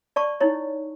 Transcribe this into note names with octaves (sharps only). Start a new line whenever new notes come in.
D5 A5 C#6
D#4 E4 C#5